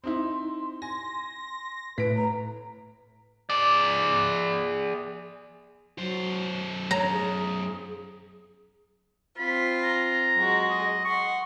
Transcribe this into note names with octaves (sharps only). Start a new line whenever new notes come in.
C4 D#4 E4 C6
G#5 A#6
A2 B4 B6 D7
A#5
G#4 D5
F#2 F#3 C5
C#5 A#5
G#4
C4 F4 B5
A#5
F#3 G#3 F#4
D#5
F#5 C6 C#6